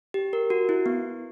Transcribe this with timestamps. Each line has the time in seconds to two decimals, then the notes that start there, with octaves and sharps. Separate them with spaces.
0.14 G4
0.33 A#4
0.50 F#4
0.69 E4
0.86 B3